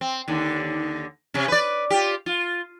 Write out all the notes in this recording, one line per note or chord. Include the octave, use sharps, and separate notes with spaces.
C4
D#2 D3
C3 C#4
B4 D5
F4 G4
F4